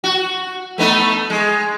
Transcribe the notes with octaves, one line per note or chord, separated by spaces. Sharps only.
F#4
A3 B3 D#4
G#3